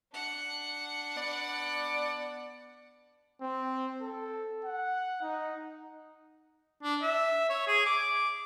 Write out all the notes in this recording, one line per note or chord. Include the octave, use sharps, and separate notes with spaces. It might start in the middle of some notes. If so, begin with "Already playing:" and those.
D4 F#5
B3 D5
C4
A4
F#5
D#4
D4
E5
C#5
G#4
D6